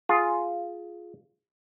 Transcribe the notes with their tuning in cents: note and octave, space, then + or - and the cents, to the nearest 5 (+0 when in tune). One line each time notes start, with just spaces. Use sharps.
F4 +0 G#4 +10